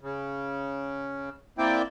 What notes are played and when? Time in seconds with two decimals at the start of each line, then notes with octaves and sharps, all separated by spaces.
0.01 C#3
1.58 A#3 C4 E4 D5 G5